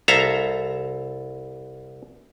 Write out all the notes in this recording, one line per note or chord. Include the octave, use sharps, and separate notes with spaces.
C2 A4 E5 F5 A#5